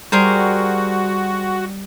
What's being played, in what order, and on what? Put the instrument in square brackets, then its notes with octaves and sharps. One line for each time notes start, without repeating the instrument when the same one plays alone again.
[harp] G3 [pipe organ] F#4 [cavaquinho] G#4 A#4 C5